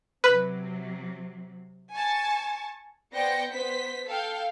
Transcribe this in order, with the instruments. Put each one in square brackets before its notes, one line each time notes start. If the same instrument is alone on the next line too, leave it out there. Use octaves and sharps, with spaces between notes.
[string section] C3 F#3 [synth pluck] B4
[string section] G#5 A5 C#6
[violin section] B3 C5 D5 G5 A#6 C#7
B3 C5 B6
A4 F5 G5